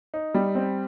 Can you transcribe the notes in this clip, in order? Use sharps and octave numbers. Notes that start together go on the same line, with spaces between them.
D#4
G3
C4